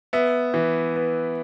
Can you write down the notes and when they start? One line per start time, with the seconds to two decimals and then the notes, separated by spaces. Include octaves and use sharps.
0.13 B3 E5
0.54 E3
0.96 B3